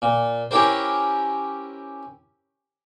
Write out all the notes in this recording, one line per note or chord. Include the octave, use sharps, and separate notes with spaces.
A#2
C#4 E4 G4 A#4 C5